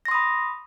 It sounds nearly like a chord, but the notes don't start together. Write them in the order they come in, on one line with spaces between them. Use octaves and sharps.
A#6 C6 D#6 B5